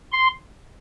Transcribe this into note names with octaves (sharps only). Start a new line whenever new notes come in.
C6